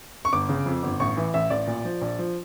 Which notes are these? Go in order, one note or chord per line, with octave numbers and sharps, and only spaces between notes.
C#6
G1 D6
C#3
F2
G1
A1 C#6
E3
A1 E5
A1 D5
A#2
F3
A#1
F3